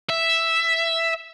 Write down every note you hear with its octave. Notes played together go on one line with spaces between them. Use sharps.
E5